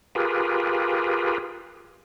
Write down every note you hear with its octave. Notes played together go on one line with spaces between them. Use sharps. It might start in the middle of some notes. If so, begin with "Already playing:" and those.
F4 G4 G#4 A#4 B4